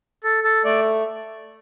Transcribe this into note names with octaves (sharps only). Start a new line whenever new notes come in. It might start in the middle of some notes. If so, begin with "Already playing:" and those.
A4
A4
A3 D5